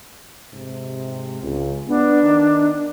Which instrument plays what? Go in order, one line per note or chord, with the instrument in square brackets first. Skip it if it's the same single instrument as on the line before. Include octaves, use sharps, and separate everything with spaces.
[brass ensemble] G#2 C3
C#2
[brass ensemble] B3 [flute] D4
[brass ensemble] D#3 D#4